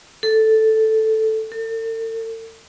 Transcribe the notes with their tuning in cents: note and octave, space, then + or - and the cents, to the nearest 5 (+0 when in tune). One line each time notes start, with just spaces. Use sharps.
A4 +0
A4 +40